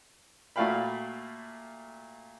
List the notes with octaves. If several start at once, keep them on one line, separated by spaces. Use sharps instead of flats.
A#2 A3 F#4 F5 G5 B5